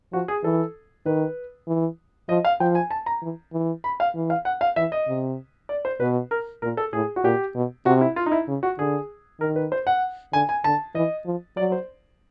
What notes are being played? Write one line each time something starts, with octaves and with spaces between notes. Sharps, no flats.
F3 F#4
G#4
E3 A4
D#3 B4
E3
F3 D#5
F5
F3 G5
G#5
A5
A#5
E3
E3
B5
F5
E3
F5
F#5
F5
E3 E5
D#5
C3
D5
C5
B2 B4
A#4
A#2 A#4
A4
A2 G#4
F#4
A#2 G4
B2
C3 F#4
E4
F4
D#4
E4
C#3
F#4
D3 G#4
D#3 A#4
B4
C5
F#5
D3 G#5
G#5
D3 A5
E3 D#5
F3
F#3 D5
C5